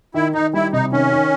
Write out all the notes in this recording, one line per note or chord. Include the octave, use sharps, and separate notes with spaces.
D#3 E4
D#3 D#4
G3 E4
C3 D#4
D#3 C#4
D#3